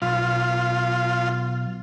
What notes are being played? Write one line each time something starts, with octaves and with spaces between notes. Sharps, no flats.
B1 F4